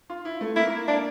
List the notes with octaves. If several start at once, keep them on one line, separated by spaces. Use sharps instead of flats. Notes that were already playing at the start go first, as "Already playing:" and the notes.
F4
E4
A3
A#3 E4
A#3
A#3 D4